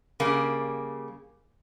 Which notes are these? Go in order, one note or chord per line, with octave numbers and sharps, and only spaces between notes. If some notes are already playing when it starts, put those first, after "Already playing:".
C#3 G3 A#3